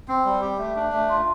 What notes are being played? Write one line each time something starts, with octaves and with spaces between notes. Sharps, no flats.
C4
G3
G4
A3
D4
A3
F4